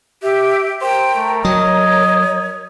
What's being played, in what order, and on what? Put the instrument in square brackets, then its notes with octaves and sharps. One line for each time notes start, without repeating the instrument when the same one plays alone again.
[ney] G4 [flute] E5
[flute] A#4 [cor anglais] C5 [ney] G5
[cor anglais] A3
[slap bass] F#3 [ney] C#5 [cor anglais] D#5